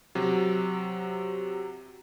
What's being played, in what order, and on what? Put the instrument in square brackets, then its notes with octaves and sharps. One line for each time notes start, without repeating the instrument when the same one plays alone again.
[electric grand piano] C3 F#3